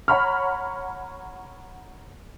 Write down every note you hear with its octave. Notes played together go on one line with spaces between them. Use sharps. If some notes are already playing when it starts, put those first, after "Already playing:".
C#5 F#5 A#5 B5 C#6 F6